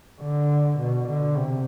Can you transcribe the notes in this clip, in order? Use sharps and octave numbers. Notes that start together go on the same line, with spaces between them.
D3
B2
D3
C3